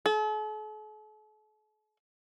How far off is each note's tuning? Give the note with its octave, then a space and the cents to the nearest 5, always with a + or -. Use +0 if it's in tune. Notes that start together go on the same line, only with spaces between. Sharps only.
A4 -45